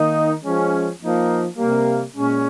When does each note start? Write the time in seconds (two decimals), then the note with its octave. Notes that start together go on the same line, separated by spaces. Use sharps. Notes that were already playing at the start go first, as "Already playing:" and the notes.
Already playing: D#3 A#3 D#4
0.43 F3 G#3 C#4
1.00 F3 A#3 D#4
1.57 C3 G3 A#3
2.13 A#2 G#3 C#4